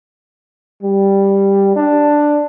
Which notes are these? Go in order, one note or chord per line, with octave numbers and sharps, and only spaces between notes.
G3
D4